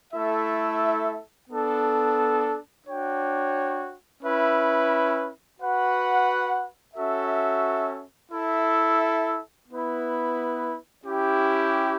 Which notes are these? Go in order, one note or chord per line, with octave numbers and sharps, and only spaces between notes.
A3 E4 A4 E5
B3 D4 A4
D4 F#4 C#5 G5
C#4 E4 B4 E5
F#4 B4 F#5
C#4 F#4 A4 E5
E4 A4 E5
B3 E4 B4
C#4 E4 G4